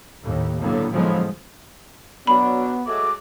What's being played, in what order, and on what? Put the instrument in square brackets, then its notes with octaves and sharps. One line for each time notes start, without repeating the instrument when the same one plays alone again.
[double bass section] D#2 A2
A2 D3 F#3 A#3 B3
A2 D3 F3 F#3 G#3 B3
[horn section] B2 F#3 D4 [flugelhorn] B3 [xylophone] B5
[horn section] F#3 G#3 A3 [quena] D6